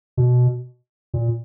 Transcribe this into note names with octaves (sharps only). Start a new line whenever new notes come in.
B2
A#2